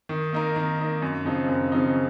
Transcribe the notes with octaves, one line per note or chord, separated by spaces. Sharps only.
D#3
A#3 D#4 A#4
D#3
A#3 D#4 A#4
F#2
C#3 F3 C4 D#4
F#2
C#3 F3 C4 D#4